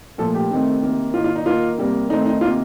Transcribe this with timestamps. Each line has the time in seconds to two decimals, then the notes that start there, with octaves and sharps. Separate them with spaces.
0.18 A#2 F3 A3 A4
0.35 G4
0.51 C3 D#3 A3 C4
0.82 C3 D#3 A#3
1.14 D#3 A#3 F4
1.24 F4
1.35 D#4
1.45 D#3 A#3 F4
1.78 C3 G3 A#3
2.09 D#3 A3 C4 D#4
2.26 D#4
2.41 C3 D#3 A#3 F4